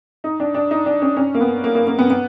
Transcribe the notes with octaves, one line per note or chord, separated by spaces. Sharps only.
D#4
D4
D4
D#4
D4
C#4
C#4
A#3
B3
A#3
A#3
A#3
B3
B3